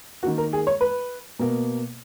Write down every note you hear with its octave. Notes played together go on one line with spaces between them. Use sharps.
D#3 A#3 F#4
A#4
G#4
C#5
B4
B2 A#3